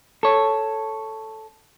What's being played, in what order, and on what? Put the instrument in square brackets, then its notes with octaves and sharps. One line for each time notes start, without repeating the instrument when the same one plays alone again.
[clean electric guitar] A4 C#5